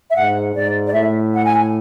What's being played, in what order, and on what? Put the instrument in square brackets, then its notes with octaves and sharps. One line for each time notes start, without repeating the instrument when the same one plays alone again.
[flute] E5
[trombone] G#2 [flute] F#5
[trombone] G#2 [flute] D5
[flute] D5
[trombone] A2 [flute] E5
[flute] F#5
G#5